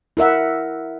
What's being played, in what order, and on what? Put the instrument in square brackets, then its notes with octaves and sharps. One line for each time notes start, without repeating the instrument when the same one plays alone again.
[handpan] E4 A#4 E5 F#5